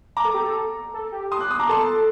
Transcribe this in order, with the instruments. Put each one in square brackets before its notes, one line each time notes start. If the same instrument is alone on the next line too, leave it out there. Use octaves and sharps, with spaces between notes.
[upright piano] A#5 D6
[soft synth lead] A4
G4
A4
A4
G4
[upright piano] C6 D#6
D6 F#6
C6 D#6
A#5 D6
[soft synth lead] A4 [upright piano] A5 C6